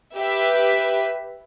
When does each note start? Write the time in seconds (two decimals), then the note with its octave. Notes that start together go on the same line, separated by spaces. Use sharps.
0.17 G4 B4 E5